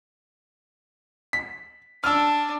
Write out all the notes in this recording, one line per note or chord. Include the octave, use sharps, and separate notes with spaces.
B6
D4 E6 F6